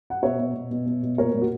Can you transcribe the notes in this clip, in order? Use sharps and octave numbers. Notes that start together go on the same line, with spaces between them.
F#5
B2 C#5 E5
B2
B2
B2
B2
B2
A#2 A#4 C#5
A#2
F#4